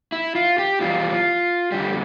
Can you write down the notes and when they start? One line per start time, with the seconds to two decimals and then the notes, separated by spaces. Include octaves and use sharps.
0.12 E4
0.35 F4
0.59 G4
0.81 F2 E3 G3 F4
1.72 F2 D3 G3 G4